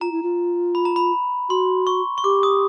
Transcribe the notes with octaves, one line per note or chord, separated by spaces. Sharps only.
F4 A#5
E4
F4
B5
A#5
B5
F#4 C6
C#6
C#6
G4 D6
D#6